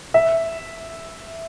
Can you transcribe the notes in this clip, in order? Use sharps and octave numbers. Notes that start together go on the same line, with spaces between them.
E5